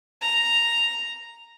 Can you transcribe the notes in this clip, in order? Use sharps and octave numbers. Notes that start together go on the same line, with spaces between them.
A#5